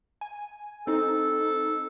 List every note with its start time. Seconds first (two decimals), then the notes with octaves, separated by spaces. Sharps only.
0.21 G#5
0.87 C4 D#4 A4